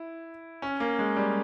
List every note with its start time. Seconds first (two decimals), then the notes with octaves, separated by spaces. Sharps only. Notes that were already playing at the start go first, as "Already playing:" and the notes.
Already playing: E4
0.62 C#4
0.80 A#3
0.99 G#3
1.16 G3